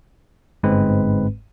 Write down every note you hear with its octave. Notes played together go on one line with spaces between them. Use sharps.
G1 G#2 G#3 C4 B4